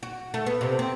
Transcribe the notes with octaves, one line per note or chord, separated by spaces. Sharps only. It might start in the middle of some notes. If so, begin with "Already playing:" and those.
F#4
A3
B3
C3
C4